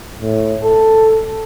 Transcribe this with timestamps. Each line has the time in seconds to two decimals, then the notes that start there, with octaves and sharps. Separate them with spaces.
0.21 A2
0.63 A4